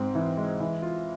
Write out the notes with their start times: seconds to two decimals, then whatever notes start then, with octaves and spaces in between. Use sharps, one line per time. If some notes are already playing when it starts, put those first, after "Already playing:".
Already playing: G#2 C4
0.15 E3
0.37 G#3
0.60 E3
0.82 F4